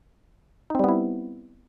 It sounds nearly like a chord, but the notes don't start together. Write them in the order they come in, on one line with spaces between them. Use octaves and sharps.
D#4 C4 G3 B3 E4